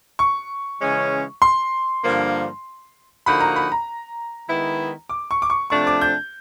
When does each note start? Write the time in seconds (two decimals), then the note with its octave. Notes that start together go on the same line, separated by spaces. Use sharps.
0.19 C#6
0.81 C#3 E3 G#3 C#4
1.42 C6
2.03 G2 D3 F3 A#3
3.26 D3 F3 A#3 D#4 F#4 B5
3.41 A#5
3.56 B5
3.72 A#5
4.48 D#3 G#3 B3 E4
5.09 D6
5.31 C#6
5.42 D6
5.50 C#6
5.70 C3 F3 A3 D4 C#6
5.87 D6
6.01 G6